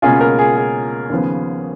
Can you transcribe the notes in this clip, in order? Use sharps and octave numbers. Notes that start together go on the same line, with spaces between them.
C#2 B2 A#3 C#4 F4 G#4
A#4
G#4
G#4
D#2 C#3 F3 B3